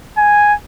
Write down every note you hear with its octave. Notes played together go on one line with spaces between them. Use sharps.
G#5